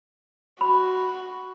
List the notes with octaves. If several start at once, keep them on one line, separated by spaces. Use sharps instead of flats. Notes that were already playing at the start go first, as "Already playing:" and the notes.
F#4 B5